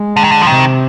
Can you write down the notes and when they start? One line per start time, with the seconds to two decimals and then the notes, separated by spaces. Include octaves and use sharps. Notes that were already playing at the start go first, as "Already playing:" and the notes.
Already playing: G#3
0.17 D3
0.24 D#3
0.31 D3
0.42 F3
0.47 C3 D#3